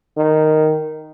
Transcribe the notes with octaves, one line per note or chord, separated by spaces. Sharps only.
D#3